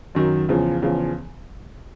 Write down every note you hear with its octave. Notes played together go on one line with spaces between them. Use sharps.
F#2 D#3 F#3
E2 C#3 F3
E2 C#3 F3